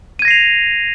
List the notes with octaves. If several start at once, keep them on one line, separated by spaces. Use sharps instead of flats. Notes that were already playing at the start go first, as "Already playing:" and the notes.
G#6 A#6 C7 D#7 F7